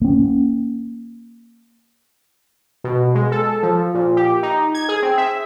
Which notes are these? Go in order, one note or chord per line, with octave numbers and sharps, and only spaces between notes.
A#3 C#4
B2
G#3
A4
F3
A#2
G4
D#4
G#6
G#4
C4
E5